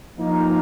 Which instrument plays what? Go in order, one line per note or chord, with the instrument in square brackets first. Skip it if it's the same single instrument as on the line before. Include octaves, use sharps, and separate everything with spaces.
[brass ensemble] F3 A#3 D#4